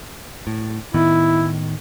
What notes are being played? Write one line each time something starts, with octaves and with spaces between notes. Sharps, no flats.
A2
A2 D#3 B3 E4